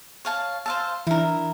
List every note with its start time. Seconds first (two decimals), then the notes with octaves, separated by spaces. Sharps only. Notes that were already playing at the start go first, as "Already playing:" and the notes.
0.25 C#5 F5 A5
0.66 C5 F5 A5 C6 E6
1.07 E3 D4 E4 A#4